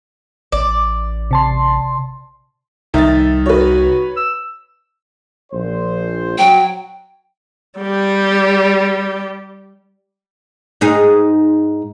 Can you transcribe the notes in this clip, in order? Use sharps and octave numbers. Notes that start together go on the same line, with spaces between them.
A1 D5
C3 A5 C6
C2 D#3 G3 E5 A6
F#4 B4 C#5
E6
A#1 C5
F#3 G5
G3 G4
G#2 D#4 G#4